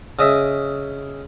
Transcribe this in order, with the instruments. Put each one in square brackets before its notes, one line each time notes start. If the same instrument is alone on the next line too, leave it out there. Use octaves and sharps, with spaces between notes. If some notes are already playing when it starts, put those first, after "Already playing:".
[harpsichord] C#3 D#5 E5